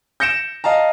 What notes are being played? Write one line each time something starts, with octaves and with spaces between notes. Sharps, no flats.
G6 A#6 C#7 D7 E7
D#5 F5 A5 A#5